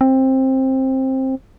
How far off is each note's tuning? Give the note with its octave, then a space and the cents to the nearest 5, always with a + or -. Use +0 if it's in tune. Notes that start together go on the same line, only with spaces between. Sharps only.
C4 +15